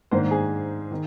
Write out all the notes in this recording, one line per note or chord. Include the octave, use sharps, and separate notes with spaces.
G#2 D#3 A#3 D4 C5
G#4
D#3